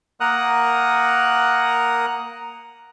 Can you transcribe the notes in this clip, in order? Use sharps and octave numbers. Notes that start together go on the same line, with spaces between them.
A#3 A#4 F#5 A#5 D#6 F#6